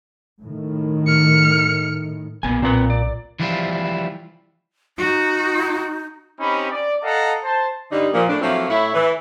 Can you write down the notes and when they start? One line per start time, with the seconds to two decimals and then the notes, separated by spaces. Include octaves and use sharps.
0.42 A2 D#3
1.07 F6 C#7
2.43 B1 A#2 B3 G#5
2.62 A#2 C4 B4
2.90 D5
3.40 E3 F3 G3 E4 F4
4.98 D#4 F#4
6.39 C4 C#4 D#4 G4 B5
6.70 D5
7.03 A4 D#5 F5 F#5 A5 A#5
7.43 C5 A5
7.91 G2 D3 G3 D4 D#4
8.13 A#2 F3
8.29 A2 D4
8.41 F3 F#3 A3 A#3 C4 E4
8.69 A2 E4 C#5
8.94 E3